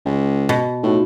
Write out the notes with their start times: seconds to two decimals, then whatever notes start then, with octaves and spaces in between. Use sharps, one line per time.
0.05 C#2
0.49 B2
0.83 A2 D#4 F4 F#4